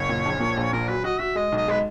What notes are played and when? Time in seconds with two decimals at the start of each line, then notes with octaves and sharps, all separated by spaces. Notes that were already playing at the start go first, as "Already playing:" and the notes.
Already playing: F#1 C#5
0.09 A#2
0.25 A#1
0.40 A#2
0.57 A#1
0.73 A#2 A#4
0.88 F#3 B4
1.04 F#4 D#5
1.19 F#4 E5
1.35 G#3 D#5
1.52 B1 D#5
1.68 G#3 B4